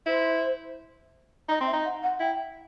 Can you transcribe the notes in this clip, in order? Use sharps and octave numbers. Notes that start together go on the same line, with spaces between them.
E4 C5
D#4 D#5
C4
E5
D#4
F#5
F#5
E4 G5